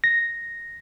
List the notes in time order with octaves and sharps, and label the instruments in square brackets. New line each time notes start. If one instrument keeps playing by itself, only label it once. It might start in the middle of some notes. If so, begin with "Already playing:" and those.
[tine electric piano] A#6